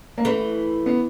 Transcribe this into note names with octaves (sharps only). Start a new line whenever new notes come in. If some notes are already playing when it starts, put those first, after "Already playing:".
A#3
E3 A3
B3